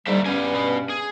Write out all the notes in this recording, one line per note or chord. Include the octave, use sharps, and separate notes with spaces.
G#2 D3 G3 A#3 E5
G2 B3 C#4 G4 G#5
B2 B3
G#4